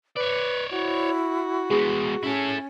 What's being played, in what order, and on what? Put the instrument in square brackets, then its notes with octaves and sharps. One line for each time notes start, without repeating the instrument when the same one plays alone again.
[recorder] B4 [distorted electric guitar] C#5 D5
[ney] E4 [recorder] F#4
[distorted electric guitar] G#3 B3 [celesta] G#4
[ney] C#4 [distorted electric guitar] E4 A4